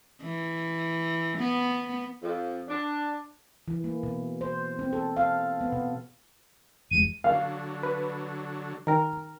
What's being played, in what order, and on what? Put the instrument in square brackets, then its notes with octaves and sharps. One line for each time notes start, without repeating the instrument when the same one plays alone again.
[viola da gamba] E3
B3
[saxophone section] F2
D4
[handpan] E3
A#3
B2
C5
C4
A4
F5
B3
B2
[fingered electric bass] F1 E2 G#3 [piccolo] D#7
[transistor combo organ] D3 F#3 [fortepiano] F5
[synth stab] B4
[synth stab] D#3 A#4 [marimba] G5 A#5